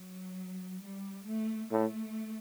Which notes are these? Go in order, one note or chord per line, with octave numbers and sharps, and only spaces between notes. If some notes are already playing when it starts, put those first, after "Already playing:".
Already playing: F#3
G3
A3
A2 A3